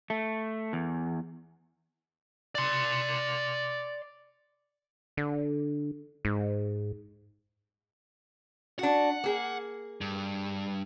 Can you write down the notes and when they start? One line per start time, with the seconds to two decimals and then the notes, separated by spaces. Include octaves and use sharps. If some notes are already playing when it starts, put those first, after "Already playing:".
0.10 A3
0.73 E2
2.55 D5 C6
5.17 D3
6.25 G#2
8.79 D4 F#4 F#5
9.24 A#3 G#4
10.01 G2